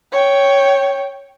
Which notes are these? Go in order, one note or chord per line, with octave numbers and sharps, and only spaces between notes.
C#5 G5